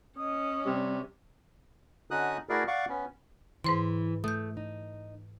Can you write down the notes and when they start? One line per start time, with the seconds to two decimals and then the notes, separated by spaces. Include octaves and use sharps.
0.18 C#4 D#5 D#6
0.66 C3 G3
2.11 D3 C#4 D#4 F#4 D#6 F#6
2.49 A3 E4 F#4 G#4 A#4 D5
2.68 D5 F5 F#5 C#6 D6
2.89 B3 C#4
3.64 G#2 E3 C5 C6
4.24 A3 D#6 G6
4.57 D#4